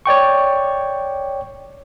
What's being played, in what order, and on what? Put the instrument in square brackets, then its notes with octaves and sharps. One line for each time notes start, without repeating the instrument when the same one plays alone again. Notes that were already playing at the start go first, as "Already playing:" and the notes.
[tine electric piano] C#5 D5 G5 C#6